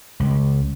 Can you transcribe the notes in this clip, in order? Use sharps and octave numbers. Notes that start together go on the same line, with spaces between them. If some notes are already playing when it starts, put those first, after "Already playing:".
C#2